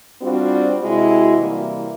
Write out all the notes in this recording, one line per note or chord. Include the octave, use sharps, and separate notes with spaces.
G3 C4 D4 F4 F#4
C3 G#3 E4 F#4
C3 E3 G3 A#3 E4